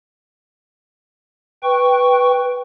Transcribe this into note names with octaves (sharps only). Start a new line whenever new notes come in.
B4 G5 C#6